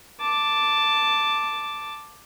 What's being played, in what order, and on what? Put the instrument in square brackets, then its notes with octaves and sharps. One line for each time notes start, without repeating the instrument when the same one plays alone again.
[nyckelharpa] A5 D6